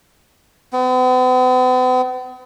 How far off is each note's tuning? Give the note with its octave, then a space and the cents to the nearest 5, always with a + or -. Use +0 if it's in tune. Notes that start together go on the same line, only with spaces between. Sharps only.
B3 +45